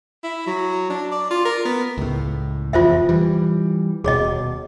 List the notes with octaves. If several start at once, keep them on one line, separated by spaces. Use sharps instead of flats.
E4
F#3
D4
D5
F4
A#4
B3
C#2 A2
F1 E2 F3 F4 C5 E5
E3 G3
D#1 B2 G#4 C#5 D#5